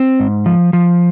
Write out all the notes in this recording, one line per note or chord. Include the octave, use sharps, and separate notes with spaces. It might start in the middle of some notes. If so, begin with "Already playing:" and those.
Already playing: C4
G#2
F3
F3